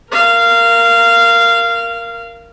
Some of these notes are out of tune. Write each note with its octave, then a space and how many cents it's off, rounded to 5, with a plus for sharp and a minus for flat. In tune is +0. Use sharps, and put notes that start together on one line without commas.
A#4 +0 F5 -20